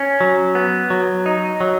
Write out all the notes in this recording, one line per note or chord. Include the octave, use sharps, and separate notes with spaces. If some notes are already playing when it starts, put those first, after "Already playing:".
Already playing: C#4
F#3
B3
F#3
D#4
F#3